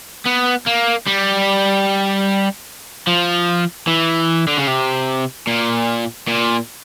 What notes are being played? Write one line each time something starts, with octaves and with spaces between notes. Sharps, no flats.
B3
A#3
G3
F3
E3
D3
C#3
C3
A#2
A#2